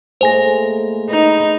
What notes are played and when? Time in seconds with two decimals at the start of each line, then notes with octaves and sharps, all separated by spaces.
0.21 A2 G#3 A#3 C5 G#5 A#6
1.10 D#4 B4